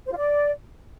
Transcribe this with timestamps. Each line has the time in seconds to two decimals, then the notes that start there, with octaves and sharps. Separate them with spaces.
0.06 C5
0.11 F4
0.17 D5